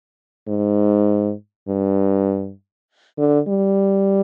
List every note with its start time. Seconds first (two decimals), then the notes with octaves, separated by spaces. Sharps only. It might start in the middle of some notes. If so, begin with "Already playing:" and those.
0.48 G#2
1.68 G2
3.18 D3
3.48 G3